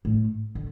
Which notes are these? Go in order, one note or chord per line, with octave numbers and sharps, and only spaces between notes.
A2
D3